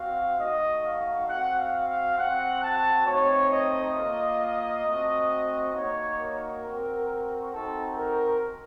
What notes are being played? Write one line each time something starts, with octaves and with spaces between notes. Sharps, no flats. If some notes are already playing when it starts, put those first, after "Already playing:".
Already playing: C4 F#4 F5
A3 D#4 F#4 D#5
F5
C4 F#4 F#5
F5
F5
C4 F#4 F#5
A5
A3 C4 D#4 C#5
D#5
A#3 F4
A3 C4 F#4
A#3 D#4 F#4 C#5
A#4
C4 F#4
C4 D#4 F#4 A4
A#4